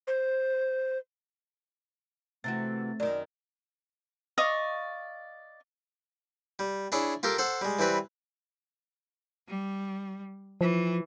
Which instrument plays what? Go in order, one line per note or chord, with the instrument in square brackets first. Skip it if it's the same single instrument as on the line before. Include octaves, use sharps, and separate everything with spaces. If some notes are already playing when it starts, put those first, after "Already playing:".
[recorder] C5
[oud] C3 E3 F#4 [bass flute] A3 [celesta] A6
[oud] F#2 D#3 [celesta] D5
[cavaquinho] D5 D#5 F5 C#6
[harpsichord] G3
D4 E4 G#4 C#5
F4 G4 A4 A#4
A4 C5 F#5
G3 G#3
E3 G3 C4 B4
[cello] G3
[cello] E3 [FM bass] F3